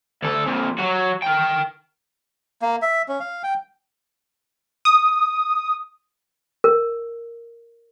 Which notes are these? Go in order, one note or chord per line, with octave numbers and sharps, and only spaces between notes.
D2 A4
F2 A#2
F#3 F#4
A#4 G5
A#3
E5
C#4
F5
G5
D#6
A#4